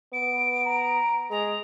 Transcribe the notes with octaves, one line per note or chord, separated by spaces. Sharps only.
B3 D7
A#5
G#3 G#4 A#5